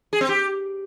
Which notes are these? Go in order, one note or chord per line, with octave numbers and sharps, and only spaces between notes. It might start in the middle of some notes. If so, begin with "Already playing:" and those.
G#4
C4
G4